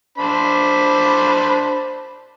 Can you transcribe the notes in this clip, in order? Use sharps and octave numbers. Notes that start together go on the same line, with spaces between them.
D4 C5 B5